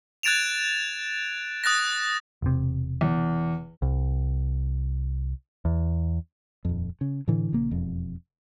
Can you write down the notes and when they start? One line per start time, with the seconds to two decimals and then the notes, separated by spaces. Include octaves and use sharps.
0.23 F#6 G#6 A6 D7 E7 F7
1.64 D#6 F#6 A6 A#6
2.42 E1 C3
3.01 E2
3.82 C2
5.65 E2
6.65 D#1 F2
7.01 C#3
7.28 A2 D3 E3
7.53 A#1 C#3 A#3
7.71 E1 F2